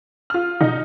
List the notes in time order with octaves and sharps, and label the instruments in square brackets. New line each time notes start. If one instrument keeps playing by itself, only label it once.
[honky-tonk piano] F4 F6
[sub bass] B2 [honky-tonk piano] D#4